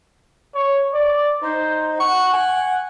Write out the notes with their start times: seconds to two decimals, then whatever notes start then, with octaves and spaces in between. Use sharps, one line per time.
0.55 C#5
0.94 D5
1.42 D#4 C5
2.00 F#5 C#6
2.33 G#5